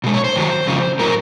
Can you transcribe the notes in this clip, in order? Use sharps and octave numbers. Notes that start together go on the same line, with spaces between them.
B2 G#3
C#5
C5
F#2 D#3 F#3
F2 C#3 F3
A2 F#3 A#4